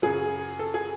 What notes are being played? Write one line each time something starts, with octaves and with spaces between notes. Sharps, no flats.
F#2 C#3 F#3 G#4
A4
G#4